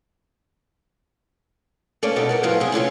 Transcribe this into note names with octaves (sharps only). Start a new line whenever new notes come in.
A3 A#3 C#4 D5
B2 G3 D#4 A4
B3 A#4 C#5
F#2 A2 F3 B3 A#4 F5
C3 G4 G#4
A2 D3 C#4 F4